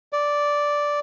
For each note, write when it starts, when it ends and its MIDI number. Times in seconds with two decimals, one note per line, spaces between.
0.13 1.00 74